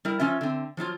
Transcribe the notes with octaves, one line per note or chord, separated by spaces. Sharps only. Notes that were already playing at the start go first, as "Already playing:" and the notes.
G3 E4 A#4
F3 C#4 F4 E5
D3 C4
F3 F#3 E4 F4